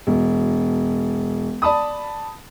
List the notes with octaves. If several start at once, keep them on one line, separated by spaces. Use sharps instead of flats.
E1
D5 A5 B5 D#6